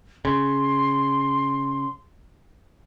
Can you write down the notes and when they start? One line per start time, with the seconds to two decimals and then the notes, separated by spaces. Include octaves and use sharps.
0.25 C#3 C6